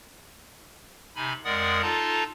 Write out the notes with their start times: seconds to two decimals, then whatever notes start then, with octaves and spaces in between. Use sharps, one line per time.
1.16 C3 D#4 G#5 B5
1.45 F2 G#3 A#4 D5 F#5 D#6
1.82 D#4 F4 A4 A5 A#5 C6